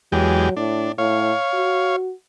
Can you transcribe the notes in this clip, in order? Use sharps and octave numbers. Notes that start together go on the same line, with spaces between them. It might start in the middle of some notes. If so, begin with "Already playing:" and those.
E2 F#3 G#3 G4
A2 D4
A2 C#5 F5
F#4